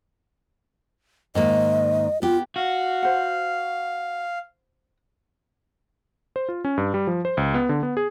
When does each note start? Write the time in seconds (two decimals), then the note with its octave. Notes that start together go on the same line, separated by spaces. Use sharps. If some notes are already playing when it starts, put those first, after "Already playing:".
1.35 G#2 D#3 A#3 D#5
2.22 B3 F4 G4
2.56 F#4 F5
3.03 C5 F#5
6.36 C5
6.49 F4
6.65 C#4
6.78 G2
6.94 G3
7.07 F3
7.25 C5
7.37 C#2
7.54 B3
7.69 D3
7.83 B3
7.97 G#4